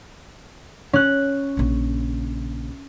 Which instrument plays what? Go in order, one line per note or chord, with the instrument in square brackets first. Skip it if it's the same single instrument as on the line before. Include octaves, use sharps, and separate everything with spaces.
[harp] C#4 F#6
[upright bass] A#1 C#3